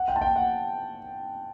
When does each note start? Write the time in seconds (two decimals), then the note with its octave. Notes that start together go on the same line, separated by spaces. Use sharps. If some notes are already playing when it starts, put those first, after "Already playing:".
Already playing: F#5
0.08 G5
0.16 A5
0.21 G5
0.36 F#5